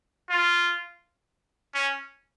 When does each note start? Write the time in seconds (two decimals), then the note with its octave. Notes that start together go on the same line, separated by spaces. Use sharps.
0.30 F4
1.74 C#4